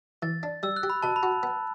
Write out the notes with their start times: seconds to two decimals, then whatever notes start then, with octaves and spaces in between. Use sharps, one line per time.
0.22 E3 A6
0.43 D4
0.63 G3 E6
0.76 F#6
0.83 G4
0.90 B5
1.02 B2 A5
1.16 B5
1.23 F#4
1.43 B3